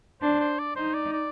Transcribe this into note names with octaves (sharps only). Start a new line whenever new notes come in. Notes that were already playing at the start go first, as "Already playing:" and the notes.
D4 C5
C5
D5
D#4 C5
D5
D5